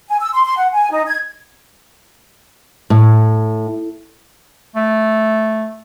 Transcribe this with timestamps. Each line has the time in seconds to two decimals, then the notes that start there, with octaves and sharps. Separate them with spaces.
0.09 G#5
0.20 E6
0.34 C6
0.45 C6
0.58 F#5
0.73 G#5
0.91 D#4
1.08 G#6
2.90 A2
4.76 A3